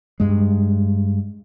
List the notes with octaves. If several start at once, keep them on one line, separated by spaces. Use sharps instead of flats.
G2 G#3